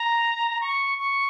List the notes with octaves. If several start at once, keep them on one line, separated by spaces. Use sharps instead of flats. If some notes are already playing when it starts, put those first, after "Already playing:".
Already playing: A#5
C#6
C#6